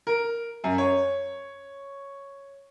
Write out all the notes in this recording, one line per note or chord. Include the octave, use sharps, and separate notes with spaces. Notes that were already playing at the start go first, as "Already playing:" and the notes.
A#4
F#2
C#5